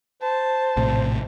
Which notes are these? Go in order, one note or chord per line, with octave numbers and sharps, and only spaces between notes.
C5 A5
A#1 A2 C3